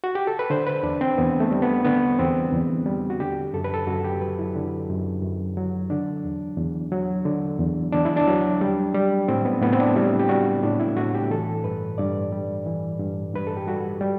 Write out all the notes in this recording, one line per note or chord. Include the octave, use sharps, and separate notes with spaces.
F#4
G4
A4
B4
D3 C5
B4
E2 D4
C4
E2 B3
A3
G3
B3
D3 B3
E2 C4
E2
G3
F#4
D3 G4
F#2 A4
B4
A4
F#2 F#4
G4
F#3 B4
E4
D3
F#2
F#2
F#3
D3 D4
E2
E2
F#3
D3
E2
E2 D4
E4
D4
F#3
G3
G3
A2 C4
B3
A2 B3
C4
D4
G3 E4
G4
G3 F#4
A2 D4
E4
A2 F#4
G4
E3 A4
G2 B4
G2 D5
G3
E3
G2
G2 B4
A4
G4
G3 F#4
G3